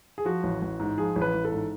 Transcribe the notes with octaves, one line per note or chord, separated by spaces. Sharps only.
G#4
F3 F#4
A1
A1
G#2
F3 G#4
A1
B4
A1
A4
G#2